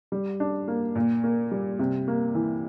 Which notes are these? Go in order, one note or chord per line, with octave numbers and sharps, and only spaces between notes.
G3
D4
A#3
A#2
A#3
G3
C3
A#3
E3